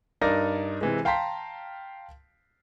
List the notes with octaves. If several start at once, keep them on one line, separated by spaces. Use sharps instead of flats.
G2 D#4 A#4 D5 A#6
C3 E3 G#3
F5 G5 A5 A#5 C6 B6